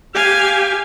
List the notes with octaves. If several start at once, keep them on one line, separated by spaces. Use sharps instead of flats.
G4 F5 G#5